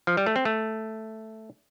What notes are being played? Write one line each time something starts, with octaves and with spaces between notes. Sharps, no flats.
F3
G3
A3
C4
A3